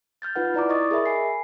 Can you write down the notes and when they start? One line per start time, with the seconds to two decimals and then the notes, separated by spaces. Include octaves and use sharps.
0.22 F6 G6 A6
0.36 D#4 F4 B4 F#5
0.54 E4 D5 A#5 D6
0.69 D#5 C#6 D#6 A6
0.91 G#4 A#4 E5 B5
1.06 G#5 C7